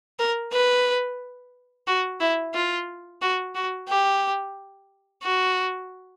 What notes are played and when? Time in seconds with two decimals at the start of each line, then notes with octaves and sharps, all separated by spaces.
0.19 A#4
0.53 B4
1.87 F#4
2.21 E4
2.54 F4
3.21 F#4
3.55 F#4
3.89 G4
5.23 F#4